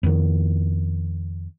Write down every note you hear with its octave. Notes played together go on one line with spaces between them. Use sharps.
F2 D#3